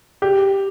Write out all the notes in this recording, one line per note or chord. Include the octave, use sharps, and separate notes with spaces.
G4